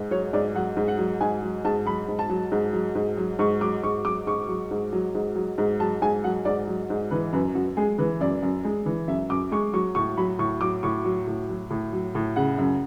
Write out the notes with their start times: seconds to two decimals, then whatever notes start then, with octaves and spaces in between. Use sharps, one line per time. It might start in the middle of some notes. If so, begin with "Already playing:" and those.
Already playing: G#2
0.11 F#3 C#5
0.33 G#2 D5
0.55 F#3 F#5
0.77 G#2
0.88 F#5
0.98 F#3
1.21 G#2 G#5
1.42 F#3
1.64 G#2 A5
1.86 F#3 B5
2.08 G#2
2.19 A5
2.29 F#3
2.52 G#2
2.73 F#3
2.95 G#2
3.17 F#3
3.39 G#2 C#6
3.61 F#3 D6
3.83 G#2 C#6
4.05 F#3 D6
4.27 G#2 C#6
4.48 F#3
4.71 G#2
4.93 F#3
5.15 G#2
5.36 F#3
5.58 G#2
5.80 F#3 A5
6.02 G#2 G#5
6.24 F#3 F#5
6.45 G#2 D5
6.67 F#3
6.90 G#2
7.11 E3 B4
7.33 F#2 B4
7.55 F#2 F#4
7.77 G#3 G#4
7.98 E3 B4
8.20 F#2 D5
8.42 F#2
8.65 G#3
8.86 E3
9.08 F#2 E5
9.29 F#2 D6
9.52 G#3 C#6
9.73 F#3 C#6
9.95 A2 C#6
10.17 F#3 B5
10.39 A2 C#6
10.61 F#3 D6
10.83 A2 C#6
11.05 F#3
11.27 A2
11.49 F#3
11.70 A2
11.93 F#3
12.15 A2
12.36 C#3 F#5
12.58 F#2